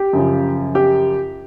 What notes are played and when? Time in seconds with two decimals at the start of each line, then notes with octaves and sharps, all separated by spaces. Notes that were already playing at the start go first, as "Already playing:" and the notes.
Already playing: G4
0.13 F#2 C#3 F3
0.75 G4